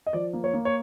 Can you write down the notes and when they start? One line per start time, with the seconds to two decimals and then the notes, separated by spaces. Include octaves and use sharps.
0.06 D#5
0.13 F3 D5
0.33 A#3
0.44 C#5
0.54 A#3
0.65 C#5